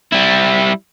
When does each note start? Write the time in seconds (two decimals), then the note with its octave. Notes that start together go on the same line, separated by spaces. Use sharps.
0.13 G3 E4